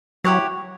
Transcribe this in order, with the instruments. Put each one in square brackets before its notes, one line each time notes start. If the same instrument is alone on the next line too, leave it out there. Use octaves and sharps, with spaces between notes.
[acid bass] F#3 [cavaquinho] E4 G4 C#5 F#5